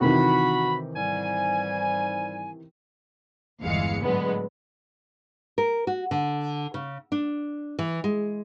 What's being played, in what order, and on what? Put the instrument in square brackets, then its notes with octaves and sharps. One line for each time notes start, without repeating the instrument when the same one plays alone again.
[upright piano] C3 D#3 E3 [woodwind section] F#4 B5
[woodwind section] G#2 G3 G#5
[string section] G1 E2 E3 G#3 F5 C#7
A2 D3 F#3 G#3 B3
[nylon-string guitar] A#4
F#4
D3
C#3
D4
E3
G#3